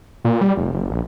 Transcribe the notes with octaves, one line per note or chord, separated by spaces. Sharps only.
A#2
G3
F1
F#1
A#1